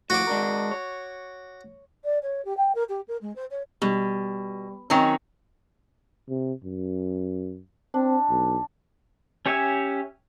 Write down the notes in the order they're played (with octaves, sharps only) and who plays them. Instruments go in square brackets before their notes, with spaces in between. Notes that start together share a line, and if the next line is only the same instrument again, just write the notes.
[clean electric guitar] A2 F3 [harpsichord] F#4 D6
[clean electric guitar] G#3 D4 A#4
C#5
[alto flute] D5
C#5
G4
G5
A#4
G4
A#4
G#3
C5
C#5
[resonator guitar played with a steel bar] B2 [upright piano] G3
[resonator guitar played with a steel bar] D#3 F#3 C#4 [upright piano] C4 G5 A#5
[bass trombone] C3
F#2
[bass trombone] C4 [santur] D4
[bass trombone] B1
[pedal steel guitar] C#4 G4 C#5 E5 G#5